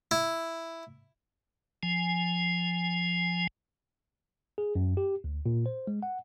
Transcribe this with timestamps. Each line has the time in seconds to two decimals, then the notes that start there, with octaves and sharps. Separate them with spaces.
0.11 E4
1.83 F3 G#5
4.58 G#4
4.75 F#2
4.97 G4
5.24 D2
5.46 A#2
5.66 C5
5.87 G#3
6.03 F#5